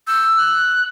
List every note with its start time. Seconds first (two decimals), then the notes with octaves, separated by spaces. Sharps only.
0.07 E6 G6
0.37 F#6